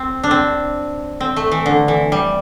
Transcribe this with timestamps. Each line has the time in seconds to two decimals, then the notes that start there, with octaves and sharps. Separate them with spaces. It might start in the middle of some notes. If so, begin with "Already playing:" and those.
Already playing: C4
0.23 D4
0.31 C4
1.20 C4
1.36 A3
1.52 E3
1.66 D3
1.88 E3
2.12 G3